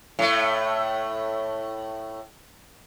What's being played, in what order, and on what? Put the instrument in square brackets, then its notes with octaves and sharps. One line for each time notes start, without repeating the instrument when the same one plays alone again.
[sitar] A2 A3